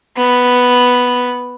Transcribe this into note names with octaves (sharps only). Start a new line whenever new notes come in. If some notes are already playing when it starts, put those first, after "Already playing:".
B3